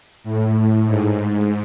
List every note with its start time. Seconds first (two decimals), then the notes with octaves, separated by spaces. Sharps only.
0.24 A2
0.86 G#2